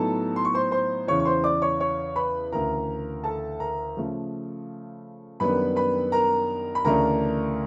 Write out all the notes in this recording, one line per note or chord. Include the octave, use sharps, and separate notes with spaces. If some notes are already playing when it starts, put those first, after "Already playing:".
Already playing: A2 F#3 B3 D#4 A4 A5
C6
C#6
C5 C6
C5 C6
E2 C#3 E3 C#5 C#6
C#6
C5 C6
D5 D6
C#5 C#6
C#5 C#6
B4 B5
D2 C#3 E3 A#4 A#5
A4 A5
A#4 A#5
C#3 F3 A3
F#2 D#3 G3 B3 D4 B4 B5
B4 B5
A#4 A#5
B5
D2 C#3 E3 A3 D4 A#4 A#5